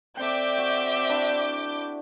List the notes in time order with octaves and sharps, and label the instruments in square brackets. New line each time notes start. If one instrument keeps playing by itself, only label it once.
[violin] C4 E5 [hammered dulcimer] A4 D5 G5 [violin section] D6 G6
[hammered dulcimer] F#4
D4 E4 B5